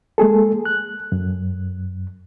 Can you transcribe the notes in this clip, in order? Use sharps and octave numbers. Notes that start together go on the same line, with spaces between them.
G#3 A#3 G#4 A4
F#6
F#2